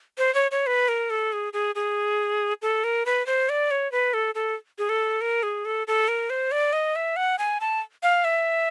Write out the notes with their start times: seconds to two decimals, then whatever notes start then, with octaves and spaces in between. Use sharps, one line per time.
0.18 C5
0.35 C#5
0.51 C#5
0.67 B4
0.88 A#4
1.10 A4
1.33 G#4
1.53 G#4
1.75 G#4
2.62 A4
2.84 A#4
3.06 B4
3.26 C5
3.49 D5
3.71 C#5
3.92 B4
4.14 A4
4.35 A4
4.78 G#4
4.89 A4
5.21 A#4
5.43 G#4
5.65 A4
5.87 A4
6.08 A#4
6.30 C5
6.52 D5
6.73 D#5
6.96 E5
7.16 F#5
7.39 G#5
7.61 A5
8.03 F5
8.24 E5